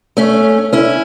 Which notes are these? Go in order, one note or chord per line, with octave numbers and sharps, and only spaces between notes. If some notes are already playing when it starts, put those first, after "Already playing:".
A3 C#4
C#4 E4